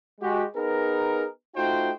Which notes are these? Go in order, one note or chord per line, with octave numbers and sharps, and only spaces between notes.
G#3 F#4 G4
B3 D#4 G#4 A#4
A3 D#4 F4 F#4 C5 G5